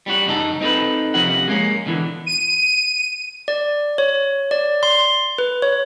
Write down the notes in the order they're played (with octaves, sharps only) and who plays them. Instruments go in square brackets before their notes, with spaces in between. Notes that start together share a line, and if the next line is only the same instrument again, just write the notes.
[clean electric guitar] G3 C#4 F#4
F#2 C#3 D#4 G4 A4
C4 D#4 G#4 A4 B4
C3 F3 C#4 F#4 F#5
G#3 A#3 C#4
B2 D3 E3
[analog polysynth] D#7
[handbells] D5
C#5
D5
C6
B4
C#5